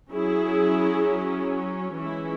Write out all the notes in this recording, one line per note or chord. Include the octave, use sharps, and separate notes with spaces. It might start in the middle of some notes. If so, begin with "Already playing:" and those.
F#3 C#4 E4 G#4
E3 G#3 C#4 E4